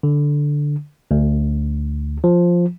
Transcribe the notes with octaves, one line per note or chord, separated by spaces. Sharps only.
D3
D2
F3